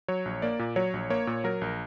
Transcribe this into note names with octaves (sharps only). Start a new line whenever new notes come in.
F#3 C#5
A#1
A#3 D5
A#2
F#3 C#5
A#1
A#3 C#5
A#2
F#3 A#4
A#1